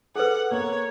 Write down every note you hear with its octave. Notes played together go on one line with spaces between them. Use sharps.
G#4 A4 B4 F#5
A#3 C#5